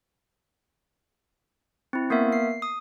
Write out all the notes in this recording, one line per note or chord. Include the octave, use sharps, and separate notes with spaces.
C4 E4
A#3 B3 A#4 E5
C7
D#6